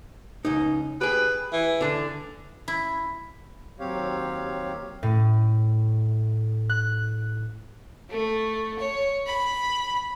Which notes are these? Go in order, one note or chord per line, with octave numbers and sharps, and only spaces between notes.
C#2 D#4
G4 G#4 B4
E3
D3 D4
E4
D#2 F#3 C4 G4 C#5 F5
A2
F#6
A3
C#5
B5